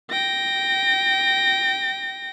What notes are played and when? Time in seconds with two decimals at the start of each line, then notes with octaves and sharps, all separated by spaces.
0.11 G5 A#6